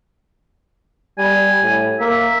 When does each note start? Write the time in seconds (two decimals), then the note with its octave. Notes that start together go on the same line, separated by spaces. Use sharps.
1.18 G3 G#5
1.63 A2
2.00 A#3 E5